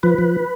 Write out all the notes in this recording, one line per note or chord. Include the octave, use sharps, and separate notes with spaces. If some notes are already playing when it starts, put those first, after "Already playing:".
F3 B4
F3